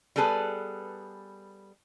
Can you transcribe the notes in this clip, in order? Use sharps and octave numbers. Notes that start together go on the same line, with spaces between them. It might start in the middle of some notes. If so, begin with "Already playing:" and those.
G3 B3 G#4 A4 B4